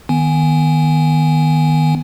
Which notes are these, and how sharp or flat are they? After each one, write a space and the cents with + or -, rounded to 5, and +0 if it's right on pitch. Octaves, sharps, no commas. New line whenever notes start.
D#3 +0 B3 +0 G#5 +0